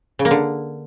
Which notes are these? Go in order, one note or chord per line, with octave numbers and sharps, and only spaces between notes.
C#3
A#3
D3